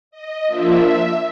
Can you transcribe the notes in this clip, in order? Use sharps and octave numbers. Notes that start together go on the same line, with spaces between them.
D#5
F3 A#3 D4 F4 E5